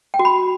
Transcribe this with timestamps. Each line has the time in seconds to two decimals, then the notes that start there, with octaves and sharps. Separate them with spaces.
0.14 G5
0.19 F#4
0.25 B5